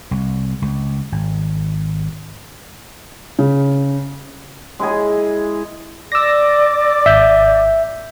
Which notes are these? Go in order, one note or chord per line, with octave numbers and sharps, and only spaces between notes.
C2
C#2
G#1
C#3
G#3 E4 G#4
D5 D6 E6 A#6
G#1 E5 G6